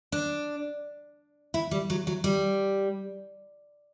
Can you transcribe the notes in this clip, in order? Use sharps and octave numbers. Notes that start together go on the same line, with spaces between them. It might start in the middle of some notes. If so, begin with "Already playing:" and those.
D4
E4
G3
F#3
F#3
G3